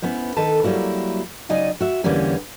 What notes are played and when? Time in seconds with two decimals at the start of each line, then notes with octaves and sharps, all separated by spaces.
0.02 B3 C#4 E4 C5
0.37 D#3 A4 B4 A5
0.64 F#3 G3 A#3 E4 F#4
1.49 C#3 F#3 D#4 D5 D#5 G#5
1.80 F#4 E5
2.04 E2 D3 E3 G3 A#3 C#4